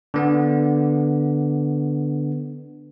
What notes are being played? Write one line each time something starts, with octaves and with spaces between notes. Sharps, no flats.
D3 B3